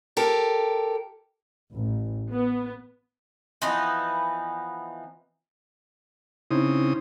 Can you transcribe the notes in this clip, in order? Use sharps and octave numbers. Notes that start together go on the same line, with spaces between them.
G4 A4 A#4
A1
B3
E3 F3 B3 D#4
C#3 C4 D#4 E4 D#6